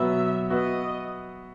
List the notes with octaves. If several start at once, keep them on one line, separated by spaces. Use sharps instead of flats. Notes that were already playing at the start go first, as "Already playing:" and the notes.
Already playing: B2 F#3 B3 F#4 B4 E5
B3 F#4 B4 D#5 E5